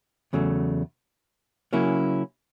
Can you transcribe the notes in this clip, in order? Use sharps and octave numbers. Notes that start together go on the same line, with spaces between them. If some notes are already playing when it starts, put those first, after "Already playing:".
E2 C#3 F#3 A3
C#3 F#3 A#3 C#4 E4